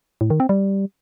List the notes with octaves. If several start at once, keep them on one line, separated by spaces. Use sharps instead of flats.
A2
D#3
C4
G3